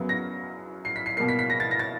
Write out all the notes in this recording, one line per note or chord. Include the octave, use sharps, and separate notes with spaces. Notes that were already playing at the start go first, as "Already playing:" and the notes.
Already playing: F#2 C#3 F#3 B3
A#6
C7
B6
C7
B2 G3 A#3 C7
B6
B6
A#6
A6
A#6
A6